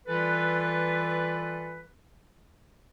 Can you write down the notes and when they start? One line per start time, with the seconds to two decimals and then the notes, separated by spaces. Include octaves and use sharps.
0.07 E3 G3 F4 A4 B4